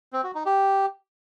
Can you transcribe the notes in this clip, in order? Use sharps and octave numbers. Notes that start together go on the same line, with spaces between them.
C4
F#4
D#4
G4